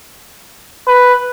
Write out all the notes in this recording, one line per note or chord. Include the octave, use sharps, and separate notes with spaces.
B4